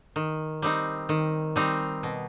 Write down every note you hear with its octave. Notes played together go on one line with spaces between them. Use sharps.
D#3
G3 C4 D#4
D#3
G3 C4 D#4
B2